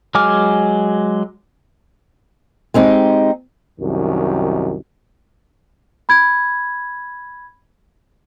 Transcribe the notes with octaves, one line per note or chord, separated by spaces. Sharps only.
F#3 G#3 G#5 D6 F6
G#3 C4 D#4 G4
C2 F#2 D#3
B5 G#6